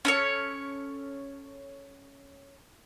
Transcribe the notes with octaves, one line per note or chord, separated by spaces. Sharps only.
C#4 A4 C#5